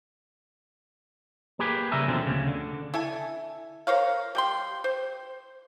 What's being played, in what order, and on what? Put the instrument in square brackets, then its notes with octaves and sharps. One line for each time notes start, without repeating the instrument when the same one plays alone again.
[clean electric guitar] A#3 G4 G#4 B4
C#3 G3 C#4 A#4 E5 G#5
D#2 B2 D3 F3 C4
D2 C#3
D3
[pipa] E4 A4 G#5
A#4 C5 C#5 F5
G3 G5 C6
C5